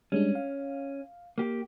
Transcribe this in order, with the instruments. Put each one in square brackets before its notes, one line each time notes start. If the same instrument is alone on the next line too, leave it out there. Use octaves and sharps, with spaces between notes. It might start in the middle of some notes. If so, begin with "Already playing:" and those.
[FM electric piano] G3 G#3 D4 [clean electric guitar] C#4
[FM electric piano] F5
[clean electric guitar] A#3 G4